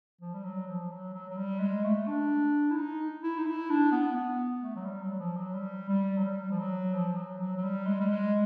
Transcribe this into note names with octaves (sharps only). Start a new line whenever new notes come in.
F3
G3
F#3
F3
F#3
F#3
F#3
G3
G#3
A3
D4
E4
D#4
E4
D#4
E4
D4
B3
B3
A3
F#3
G3
F#3
F3
F#3
G3
G3
F#3
G3
F3
F#3
F3
F#3
F#3
F#3
G3
G#3
G3
G#3